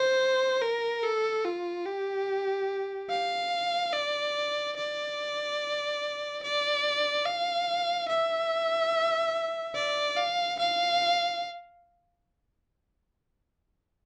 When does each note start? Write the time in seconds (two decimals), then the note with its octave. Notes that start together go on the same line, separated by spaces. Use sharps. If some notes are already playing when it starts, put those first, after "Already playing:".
Already playing: C5
0.61 A#4
1.03 A4
1.45 F4
1.86 G4
3.10 F5
3.94 D5
4.77 D5
6.43 D5
7.26 F5
8.09 E5
9.75 D5
10.17 F5
10.59 F5